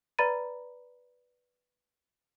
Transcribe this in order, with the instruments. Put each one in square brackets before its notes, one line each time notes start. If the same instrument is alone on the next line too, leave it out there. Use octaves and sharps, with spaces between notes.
[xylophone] B4 D5 A#5 B5 A6 D#7